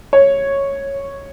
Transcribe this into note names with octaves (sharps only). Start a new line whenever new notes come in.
C#5